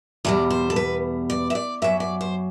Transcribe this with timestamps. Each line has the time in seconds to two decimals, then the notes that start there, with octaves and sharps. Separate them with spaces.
0.25 E2 B2 G3 D5
0.50 C5
0.70 A4
0.76 B4
1.30 D5
1.50 E5
1.55 D5
1.82 F#2 F#3 E5
2.00 D5
2.21 C5